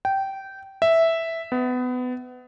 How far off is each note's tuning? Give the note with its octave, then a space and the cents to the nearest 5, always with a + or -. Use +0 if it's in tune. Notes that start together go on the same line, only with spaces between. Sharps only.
G5 -15
E5 -5
B3 +25